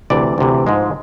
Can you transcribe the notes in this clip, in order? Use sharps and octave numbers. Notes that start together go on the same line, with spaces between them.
D2 C3 E3 D5
D2 C3 E3
G#2 F3 G#3